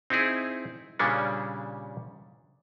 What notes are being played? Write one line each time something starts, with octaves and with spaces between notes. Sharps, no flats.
C4 D#4 E4 G#4
A#2 C#3 G3 A#3 C#4 D4